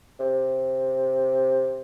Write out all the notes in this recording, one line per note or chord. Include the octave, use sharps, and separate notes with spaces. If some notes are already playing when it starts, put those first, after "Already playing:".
C3